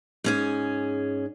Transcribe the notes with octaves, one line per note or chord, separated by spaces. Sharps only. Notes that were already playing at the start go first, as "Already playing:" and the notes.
G#2 C#4 G#4